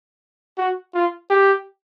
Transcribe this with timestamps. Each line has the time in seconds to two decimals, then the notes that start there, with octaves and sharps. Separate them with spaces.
0.58 F#4
0.94 F4
1.30 G4